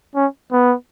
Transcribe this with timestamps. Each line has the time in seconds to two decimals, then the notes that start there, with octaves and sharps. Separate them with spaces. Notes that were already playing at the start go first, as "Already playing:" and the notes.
0.15 C#4
0.52 B3